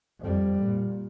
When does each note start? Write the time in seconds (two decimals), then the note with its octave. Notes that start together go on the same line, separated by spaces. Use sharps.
0.20 F2 G3
0.63 A#2